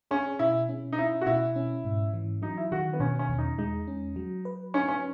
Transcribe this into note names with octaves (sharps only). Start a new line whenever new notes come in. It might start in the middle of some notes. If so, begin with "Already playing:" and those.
C#4 G#4
B2 E4
C#4
D#4
C#4 E4
F#4
B2 E4
C#4
G#2
E3
F#3 D#4
E4
D#3 F#4
B3
B2 C#4
C#4
E2
D#4
G#3 D#4
C#4
F#3
B4
C#4 D#4
C#4